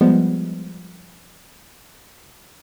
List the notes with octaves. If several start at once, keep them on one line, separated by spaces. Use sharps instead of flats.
F3 G3 G#3 B3